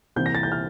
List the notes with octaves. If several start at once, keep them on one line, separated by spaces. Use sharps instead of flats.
C2 C3 E3 A#3 G6
A#6
A6
G6
F6